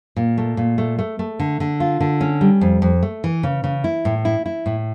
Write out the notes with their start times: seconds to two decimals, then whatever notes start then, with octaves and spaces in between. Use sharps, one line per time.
0.16 A#2
0.38 A3
0.57 A#2
0.78 A3
0.99 A3
1.19 A3
1.40 D3
1.60 D3
1.80 F4
2.00 D3
2.21 C#4
2.41 G3
2.61 F2
2.82 F2
3.03 A3
3.24 E3
3.43 C#3
3.64 C#3
3.84 E4
4.05 A2
4.25 E4
4.46 E4
4.66 A2